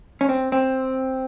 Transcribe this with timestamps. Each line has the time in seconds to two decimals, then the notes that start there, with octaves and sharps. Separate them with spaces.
0.21 C#4
0.29 C4
0.52 C4